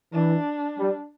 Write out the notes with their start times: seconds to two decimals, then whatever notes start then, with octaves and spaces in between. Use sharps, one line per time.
0.13 E3 D4
0.79 G3